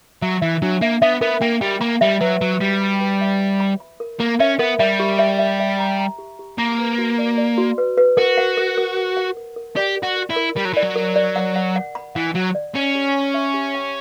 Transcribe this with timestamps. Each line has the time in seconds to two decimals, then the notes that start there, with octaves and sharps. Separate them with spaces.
0.22 F#3 E5
0.42 E3 E5
0.62 F#3 D4
0.81 A#3 E5
1.02 B3 E5
1.21 B3 A#4
1.41 A#3 G5
1.61 G3 G5
1.81 A#3 B5
2.01 G3 E5
2.21 F#3 B4
2.41 F#3 B4
2.61 G3 F#4
2.81 B5
3.01 B4
3.21 E5
3.41 B5
3.60 B5
3.80 B5
4.00 A#4
4.20 A#3 A#4
4.40 C#4 E5
4.59 B3 A#4
4.79 G3 E5
5.00 G4
5.19 E5
5.39 E5
5.60 E5
5.79 A#5
5.99 A#5
6.18 G4
6.39 G4
6.58 A#3 A#5
6.79 B4
6.98 F#4
7.19 D5
7.38 D5
7.58 F#4
7.78 B4
7.97 B4
8.17 F#4 A#4
8.38 F#5
8.57 A#4
8.78 A#4
8.97 A#4
9.17 F#5
9.37 A#4
9.56 A#4
9.76 G4 D5
9.97 A#4
10.03 F#4
10.16 A#4
10.30 E4
10.36 A#4
10.56 G3 A#4
10.65 F#3
10.73 E3 D5
10.82 F#3
10.96 A#4
11.16 D5
11.36 F#5
11.56 F#5
11.76 F#5
11.95 B5
12.15 E3 F#5
12.35 F#3 F#5
12.55 D5
12.75 C#4 F#5
12.95 G4
13.15 C#5
13.34 E5
13.54 G4
13.74 G5